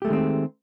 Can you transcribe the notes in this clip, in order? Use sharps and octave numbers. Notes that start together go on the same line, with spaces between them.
D#3 G#3 A3 C4 G4